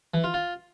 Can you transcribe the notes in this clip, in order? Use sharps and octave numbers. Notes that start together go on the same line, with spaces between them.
E3
F4
F4